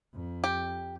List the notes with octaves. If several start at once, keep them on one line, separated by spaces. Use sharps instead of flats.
F2
G4